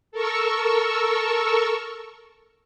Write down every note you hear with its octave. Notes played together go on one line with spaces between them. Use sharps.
A4 A#4 C#6 E6